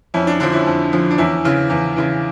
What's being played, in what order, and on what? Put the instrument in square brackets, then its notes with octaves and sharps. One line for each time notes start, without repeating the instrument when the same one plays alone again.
[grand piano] F2 C#4 E4
D4
D3 F3 D4
C#4 E4
F2
D3 F3
D4
E2 C#4 E4
C#3 E3
E2
C#3 E3